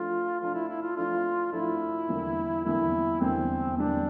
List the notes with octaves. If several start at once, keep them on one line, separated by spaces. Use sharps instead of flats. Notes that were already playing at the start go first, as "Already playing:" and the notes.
Already playing: F3 A3 D4 F4
F3 A3 D4 F4
E4
E4
F4
F3 A3 D4 F4
F3 A3 D4 E4
E2 D3 G3 A#3
E2 D3 G3 A#3 E4
E2 D3 G3 A#3 C4
E2 D3 G3 A#3 D4